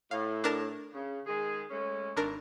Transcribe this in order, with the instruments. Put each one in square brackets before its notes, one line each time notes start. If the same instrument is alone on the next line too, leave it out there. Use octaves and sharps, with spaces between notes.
[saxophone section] A2 [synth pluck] F5
[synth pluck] D4 A#4 A5
[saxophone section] C#3
D#3 G#3 G#4
G#3 A3 C#4
[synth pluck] G#1 D4 A#4